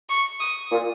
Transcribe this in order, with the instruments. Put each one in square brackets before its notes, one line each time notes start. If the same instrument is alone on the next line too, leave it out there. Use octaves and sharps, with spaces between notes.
[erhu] C#6
D#6
[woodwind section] A#2